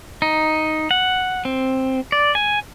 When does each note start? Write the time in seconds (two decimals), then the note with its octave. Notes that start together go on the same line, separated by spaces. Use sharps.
0.22 D#4
0.91 F#5
1.45 C4
2.12 D5
2.35 G#5